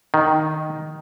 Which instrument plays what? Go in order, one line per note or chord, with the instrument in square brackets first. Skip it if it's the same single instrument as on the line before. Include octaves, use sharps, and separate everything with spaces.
[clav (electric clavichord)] D#3